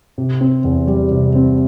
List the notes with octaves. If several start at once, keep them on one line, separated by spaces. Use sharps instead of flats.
C3
C4
E2
G3
C3
C4